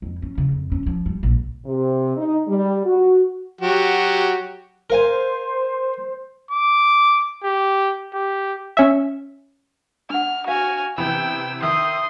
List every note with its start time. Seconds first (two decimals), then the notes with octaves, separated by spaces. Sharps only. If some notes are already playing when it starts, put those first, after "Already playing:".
0.02 F2
0.22 C#4
0.38 C#3
0.52 F2
0.72 C#4
0.86 F3
1.06 G3
1.23 A#1
1.66 C3
2.17 D#4
2.48 G3
2.85 F#4
3.61 F#3 F#4 G4
4.90 A#4 C5 F5 G#5
6.51 D6
7.44 G4
8.14 G4
8.77 C#4 E5
10.10 D4 F#5 F6
10.48 F#4 F5 G#5 F6
10.98 C3 E3 B3 G5 B5 E6
11.63 D#3 E5 C6 D#6